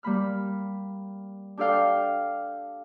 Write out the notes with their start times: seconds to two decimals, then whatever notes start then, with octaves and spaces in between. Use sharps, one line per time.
0.03 G3 A#3 B5 F6
1.57 D4 G4 A4 D5 F5 G5